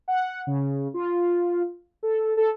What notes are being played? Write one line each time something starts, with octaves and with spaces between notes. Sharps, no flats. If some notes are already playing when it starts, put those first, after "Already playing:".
F#5
C#3
F4
A4
A4